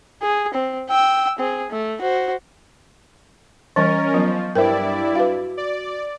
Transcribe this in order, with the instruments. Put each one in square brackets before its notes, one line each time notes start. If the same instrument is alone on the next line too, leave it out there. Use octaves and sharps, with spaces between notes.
[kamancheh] G#4
C4
G5 E6
C4 G#4
A3
F#4 C5
[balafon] E3 G3 A5 [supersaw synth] C#4 A#4 [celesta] D#5 C#6 A6
[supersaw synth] F3 [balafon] F#3 B3
[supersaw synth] G2 E4 D5 [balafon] A#4 C5 E5 [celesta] G5
[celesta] F#4 [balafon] B4 F5
[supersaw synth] D5